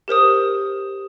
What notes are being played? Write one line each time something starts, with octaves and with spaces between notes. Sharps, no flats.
G4 A#4 C5 D#6